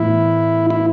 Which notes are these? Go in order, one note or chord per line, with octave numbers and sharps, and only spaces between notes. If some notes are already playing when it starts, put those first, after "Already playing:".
Already playing: A2 E3 B3 E4
E4